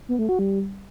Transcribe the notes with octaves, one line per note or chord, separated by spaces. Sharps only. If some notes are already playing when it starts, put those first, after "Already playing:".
B3
A3
F#4
G3